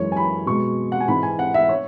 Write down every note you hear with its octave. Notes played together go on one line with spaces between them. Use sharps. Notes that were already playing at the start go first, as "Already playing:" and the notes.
Already playing: F#2 E3 G#3 C#5
G#5
B5
B2 G#3 C#6
F#5
G#5
G#2 E3 G#3 B5
G#5
F#5
E5
C#5